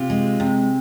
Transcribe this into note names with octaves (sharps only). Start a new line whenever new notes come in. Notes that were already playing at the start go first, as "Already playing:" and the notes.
Already playing: C3 F4
G#3
C3